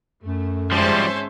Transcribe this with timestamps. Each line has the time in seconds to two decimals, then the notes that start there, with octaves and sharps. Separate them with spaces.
0.24 F#2 A3
0.72 G#1 F3 G3 G#3 C#4 C5 E5 A5